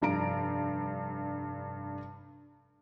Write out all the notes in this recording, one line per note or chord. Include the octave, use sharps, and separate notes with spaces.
F1 G2 A#5 D7